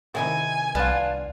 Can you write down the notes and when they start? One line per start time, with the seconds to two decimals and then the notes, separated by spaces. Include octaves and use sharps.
0.15 C3 D#3 E4 G#5
0.75 C2 B3 D4 F4 A5